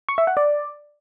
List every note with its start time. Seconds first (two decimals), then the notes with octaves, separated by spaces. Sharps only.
0.09 C#6
0.18 E5
0.27 F#5
0.37 D5